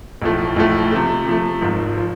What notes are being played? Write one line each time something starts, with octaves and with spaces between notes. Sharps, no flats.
B1 A2 F3 A3
B1 A2 F3 A3
C3 F3 A3
C3 F3 A3
G#1 G#2 F3
F3